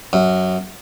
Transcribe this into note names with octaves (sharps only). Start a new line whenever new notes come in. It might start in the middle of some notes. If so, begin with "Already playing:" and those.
F#2